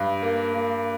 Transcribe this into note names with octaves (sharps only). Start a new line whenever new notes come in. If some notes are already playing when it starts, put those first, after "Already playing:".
Already playing: G2
A#3
A#3